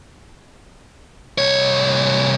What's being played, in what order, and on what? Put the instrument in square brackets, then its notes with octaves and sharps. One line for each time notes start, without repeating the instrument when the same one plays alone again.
[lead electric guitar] C2 C#5